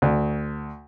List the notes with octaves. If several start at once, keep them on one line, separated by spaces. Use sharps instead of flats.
D2